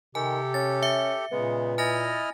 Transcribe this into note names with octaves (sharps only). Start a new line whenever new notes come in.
C3 D#3 G4 A4 G#5
C#4 A6
E5 C#7
A#2 C#3 G#3 B3
E4 D#5 G#5 F6 A6 A#6